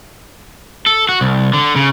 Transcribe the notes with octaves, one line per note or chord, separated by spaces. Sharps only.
A4
F#4
C2
D3
C#3